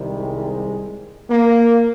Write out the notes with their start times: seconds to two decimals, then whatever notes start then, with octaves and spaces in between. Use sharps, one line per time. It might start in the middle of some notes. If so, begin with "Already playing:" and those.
Already playing: C2 C3 D#3 G3
0.09 G#3
1.30 A#3